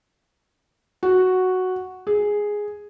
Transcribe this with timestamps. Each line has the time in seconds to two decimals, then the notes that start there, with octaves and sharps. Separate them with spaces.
1.03 F#4
2.07 G#4